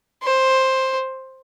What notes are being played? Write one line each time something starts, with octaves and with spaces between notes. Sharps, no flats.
C5